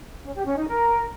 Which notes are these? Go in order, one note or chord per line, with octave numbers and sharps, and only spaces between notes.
C#4
G4
C#4
D#4
A#4